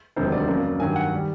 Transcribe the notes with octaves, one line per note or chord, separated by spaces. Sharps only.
E1 D2 C3 D#3 F#3 C5
D5
F2 C#3 F#3 A#3
G2 D#3 F#3 G#5
F#5
D#3 G3